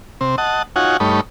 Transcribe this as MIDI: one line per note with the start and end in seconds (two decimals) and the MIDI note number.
0.21 0.36 48
0.21 0.36 60
0.38 0.62 75
0.38 0.62 78
0.38 0.62 81
0.76 0.97 63
0.76 0.97 65
0.76 0.97 66
0.76 0.97 73
0.76 0.97 78
0.76 0.97 80
1.00 1.21 43
1.00 1.21 57
1.00 1.21 63
1.00 1.21 73
1.00 1.21 83